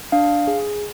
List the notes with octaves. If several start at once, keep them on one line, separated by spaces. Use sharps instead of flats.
D4 F5
G#4